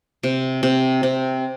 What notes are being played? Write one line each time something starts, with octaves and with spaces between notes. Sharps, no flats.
C3
C3
C3